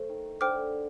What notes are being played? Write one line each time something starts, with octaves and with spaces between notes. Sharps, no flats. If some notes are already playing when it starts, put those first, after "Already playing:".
Already playing: A3 C5
D#3
D3 C5 G5 D6 F6